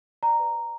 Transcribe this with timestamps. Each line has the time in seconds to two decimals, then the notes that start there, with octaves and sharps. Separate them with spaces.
0.23 D5 A#5
0.39 B4
0.55 D5